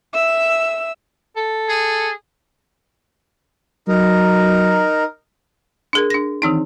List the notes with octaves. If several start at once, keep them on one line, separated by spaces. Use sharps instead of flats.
E5 E6
A4
G#4
F#3 D#4 A#4
D4 G#4 A#4
D4 A#6
D#3 E3 C4 D#4